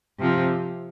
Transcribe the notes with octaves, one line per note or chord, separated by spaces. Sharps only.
C3 F3